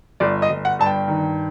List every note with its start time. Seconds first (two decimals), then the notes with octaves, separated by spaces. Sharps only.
0.20 G1 D5
0.42 D#5
0.50 G1
0.65 F#5
0.79 G2 A5
0.86 G5
1.08 D#3